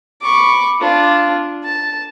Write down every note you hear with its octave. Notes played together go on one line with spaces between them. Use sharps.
B5 C#6 D6
D4 F4
A5